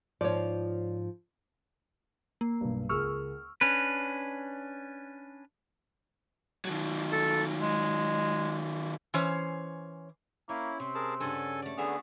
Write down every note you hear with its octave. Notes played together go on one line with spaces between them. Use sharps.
G#2 F3 C#5 D5
A#3
B1 G2
C#2 G#4 A#4 C#6 E6 F6
C#4 D4 B4
D#3 F#3
A4
G#3
E3 C#4 C5 C#5
A#3 C#4 E4 G4
C3 C4
G#4 A#4 A5
G2 C#3 A4 F#5 G#5
A3 D5
D3 B3 F#4 G#4 E5 F5